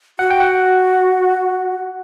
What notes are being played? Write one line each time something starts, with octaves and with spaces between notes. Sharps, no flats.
F#4 F#5
G5
F#5